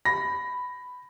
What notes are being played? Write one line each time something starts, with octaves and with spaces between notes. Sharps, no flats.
B5 A#6